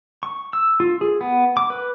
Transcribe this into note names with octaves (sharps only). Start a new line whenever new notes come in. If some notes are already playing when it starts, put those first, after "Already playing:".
C#6
E6
F4
G#4
B3
D6
B4